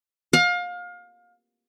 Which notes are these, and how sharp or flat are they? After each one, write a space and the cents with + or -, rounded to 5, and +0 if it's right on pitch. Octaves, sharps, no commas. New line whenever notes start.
F5 +30